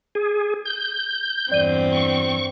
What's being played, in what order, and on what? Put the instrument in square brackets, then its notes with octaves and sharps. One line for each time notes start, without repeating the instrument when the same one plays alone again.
[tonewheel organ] G#4
G6
[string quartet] E2 G2 C4 [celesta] D5 D#7
[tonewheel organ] C#6